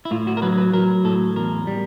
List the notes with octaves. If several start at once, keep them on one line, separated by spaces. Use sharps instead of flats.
E4
A2 F4
F#4
A#4
F#3 B4
B4
F#3 A#4
A2 A4
E2 A#4
G3